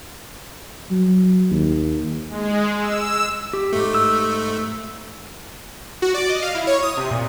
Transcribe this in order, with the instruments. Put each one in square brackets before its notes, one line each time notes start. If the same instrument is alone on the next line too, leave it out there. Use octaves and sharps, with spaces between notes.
[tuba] F#3
D#2
[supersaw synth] G#3
E6
[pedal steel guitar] G4
[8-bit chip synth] G#2 A3
[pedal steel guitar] E6
[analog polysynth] F#4
D5
D#5
F5
E4
C#5
D#6
C3
A#2